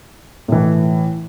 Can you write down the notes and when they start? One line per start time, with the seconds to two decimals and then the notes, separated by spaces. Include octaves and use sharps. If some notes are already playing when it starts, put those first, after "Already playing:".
0.48 A2 E3